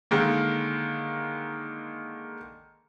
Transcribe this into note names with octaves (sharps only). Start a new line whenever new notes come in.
D3 D#3 G#3 A#3